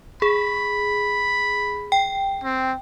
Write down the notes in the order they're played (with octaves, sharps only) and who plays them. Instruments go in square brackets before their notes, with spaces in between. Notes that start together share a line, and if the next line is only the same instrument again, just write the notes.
[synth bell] G#4 [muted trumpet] B5
[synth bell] G5
[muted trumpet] C4